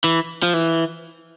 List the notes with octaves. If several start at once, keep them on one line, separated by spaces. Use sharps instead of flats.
E3
F3
E3